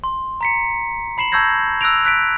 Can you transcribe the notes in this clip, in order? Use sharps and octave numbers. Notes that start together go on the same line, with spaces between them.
C6
A#5 B6 C#7
B5 C7 E7 F#7
A5 C#6 E6 G6 G#6 A#6
E6 F#6 A#6 D7 F7
F#6 B6 D7